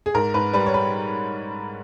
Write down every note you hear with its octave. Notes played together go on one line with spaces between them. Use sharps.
G#4
G#2 A#4
G#2 B4
G3 B4
C#5
B4